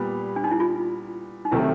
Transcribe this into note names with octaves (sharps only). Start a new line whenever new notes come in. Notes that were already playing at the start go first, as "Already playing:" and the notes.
Already playing: A#2 G3 B3
D4
D#4
E4
F4
D#4
C3 D#3 F#3 A3 E4